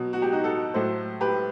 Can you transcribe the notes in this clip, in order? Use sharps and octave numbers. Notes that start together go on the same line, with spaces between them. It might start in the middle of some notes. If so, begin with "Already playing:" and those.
Already playing: B2 F#3
F#4
G4
D#4 F#4
F#4 A4
A2 F#3 A4 C5
G4 B4